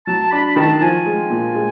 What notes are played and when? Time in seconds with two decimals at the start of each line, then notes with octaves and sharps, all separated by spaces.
0.07 F#3 A5
0.31 D4 B5
0.56 D#3 A5
0.81 F3 G#5
1.06 G#3
1.30 A#2
1.55 G#3